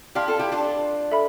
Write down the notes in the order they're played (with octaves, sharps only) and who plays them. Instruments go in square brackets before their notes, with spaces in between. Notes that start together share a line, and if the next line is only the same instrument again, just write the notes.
[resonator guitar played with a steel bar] E4 G4 [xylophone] D5 F5 A5 C6 F6
[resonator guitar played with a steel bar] F4 A4
E4 G4
D4 F4
[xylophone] A4 E5 B5